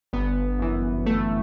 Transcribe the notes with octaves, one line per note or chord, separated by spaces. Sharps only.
G1 B3
F#2 E3
G1 A3